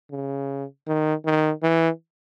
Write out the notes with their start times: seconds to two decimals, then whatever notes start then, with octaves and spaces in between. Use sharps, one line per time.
0.11 C#3
0.87 D#3
1.25 D#3
1.63 E3